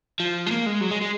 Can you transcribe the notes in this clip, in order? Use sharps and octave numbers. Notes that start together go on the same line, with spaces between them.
F3
G#3
A#3
G#3
F#3
G#3
G#3